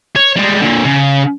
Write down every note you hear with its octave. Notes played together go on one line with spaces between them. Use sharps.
C#5
G3 G#3
A#2 D3
C#3